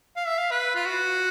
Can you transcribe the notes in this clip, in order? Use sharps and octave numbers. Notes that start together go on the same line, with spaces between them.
F5
E5
F5
B4
F4
F#4